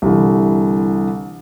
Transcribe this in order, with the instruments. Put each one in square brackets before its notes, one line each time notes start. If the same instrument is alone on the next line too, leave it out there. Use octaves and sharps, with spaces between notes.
[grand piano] C2 D3 E3